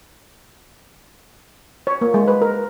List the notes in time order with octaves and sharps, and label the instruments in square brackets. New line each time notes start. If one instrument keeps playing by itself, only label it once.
[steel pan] C#5
A#3
G#3
B4
A#4